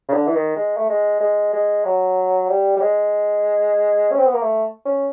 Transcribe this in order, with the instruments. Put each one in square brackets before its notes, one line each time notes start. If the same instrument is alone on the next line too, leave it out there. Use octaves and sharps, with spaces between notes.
[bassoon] C#3
D3
E3
D#3
G#3
A3
G#3
G#3
G#3
F#3
G3
G3
G#3
C#4
C4
B3
A#3
A3
C#4